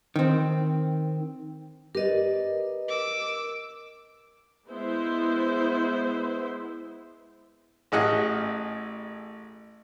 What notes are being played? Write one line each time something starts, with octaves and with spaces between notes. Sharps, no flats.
D#3 C4
G4 A#4 B4 D5 D#5
D6 E6
G#3 B3 E4 C5
A1 G#4 D#5 F#5 F6